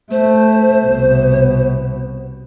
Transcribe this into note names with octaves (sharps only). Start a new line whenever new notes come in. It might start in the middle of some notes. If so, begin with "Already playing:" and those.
A3 C5
C2 B2